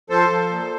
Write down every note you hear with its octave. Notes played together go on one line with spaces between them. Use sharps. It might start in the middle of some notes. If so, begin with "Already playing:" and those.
F3 A4 C5
F3
A#2